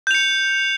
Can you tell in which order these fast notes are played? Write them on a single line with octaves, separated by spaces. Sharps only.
G6 F7 C#7